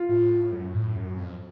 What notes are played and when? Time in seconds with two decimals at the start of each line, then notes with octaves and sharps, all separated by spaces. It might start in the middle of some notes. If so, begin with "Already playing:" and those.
Already playing: F4
0.09 A2
0.52 F#2
0.74 A2
0.96 F#2
1.18 F2